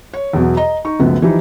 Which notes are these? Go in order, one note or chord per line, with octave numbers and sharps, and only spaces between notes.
C#5
E2 B2 F#3
D#5 A#5
D#4 C#6
C#2 F#2 F3 A3 B3
E3 F3 G3 D#4